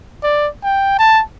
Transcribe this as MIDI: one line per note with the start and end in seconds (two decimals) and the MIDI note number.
0.23 0.48 74
0.64 0.95 79
0.99 1.22 81